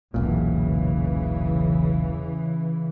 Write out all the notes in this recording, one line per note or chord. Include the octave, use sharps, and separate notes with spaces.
E1 B1 A#2 C#3 E3